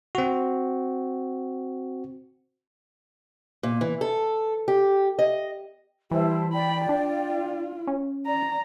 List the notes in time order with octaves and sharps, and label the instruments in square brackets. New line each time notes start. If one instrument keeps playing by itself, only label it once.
[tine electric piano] C4 F#4
[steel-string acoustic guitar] A#2
E3
A4
G4
D#5
[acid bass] E3 [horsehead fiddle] G3 [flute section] E4 C5 A5
[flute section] D5 G5 [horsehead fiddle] B5
[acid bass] D4 [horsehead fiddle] F4
[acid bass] C#4
[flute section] D5 [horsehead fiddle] A#5